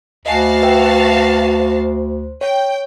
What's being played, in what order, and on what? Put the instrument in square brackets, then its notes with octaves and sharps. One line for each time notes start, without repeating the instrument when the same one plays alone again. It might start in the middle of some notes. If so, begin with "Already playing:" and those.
[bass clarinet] D2 [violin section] F#4 F5 A5 [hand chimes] D#5 G#5
[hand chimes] B4 E5 G5
C5
[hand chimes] C#5 [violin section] G5